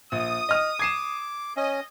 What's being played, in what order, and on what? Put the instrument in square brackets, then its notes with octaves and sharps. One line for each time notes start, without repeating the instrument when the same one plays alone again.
[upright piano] A#1 [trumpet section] D#6
[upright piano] D#5 F6
[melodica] D6 [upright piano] G#6 C7 E7
[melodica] C#4 [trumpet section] D#5